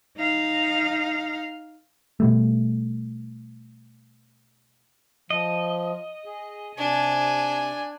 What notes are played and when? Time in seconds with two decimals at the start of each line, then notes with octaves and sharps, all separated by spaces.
0.17 D#4 F5
2.20 B2 G3 A3
5.30 F3 D#5
6.26 G#4
6.78 C3 D4 G#5